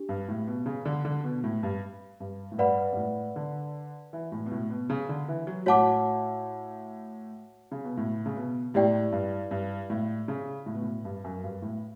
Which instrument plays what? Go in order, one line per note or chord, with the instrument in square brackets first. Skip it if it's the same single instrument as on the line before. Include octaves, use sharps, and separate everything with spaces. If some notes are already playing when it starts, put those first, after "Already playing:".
Already playing: [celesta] D4 G4
[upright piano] G2
A2
B2
C#3
D3
D3
B2
A2
G2
G2
A2
[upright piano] G2 [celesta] B4 D5 F#5 B5
[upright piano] G2
A2
D3
E3
A2
B2
A2
B2
C#3
D3
E3
F#3
[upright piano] A2 [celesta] F#4 C#5 F#5 A5 D6
[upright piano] C#3
B2
A2
C#3
B2
[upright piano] A2 [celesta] E4 G4 D5 G5
[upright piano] G2
G2
A2
C#3
A2
B2
A2
G2
F#2
G2
A2